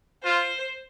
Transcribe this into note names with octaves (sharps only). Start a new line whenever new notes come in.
F4 C5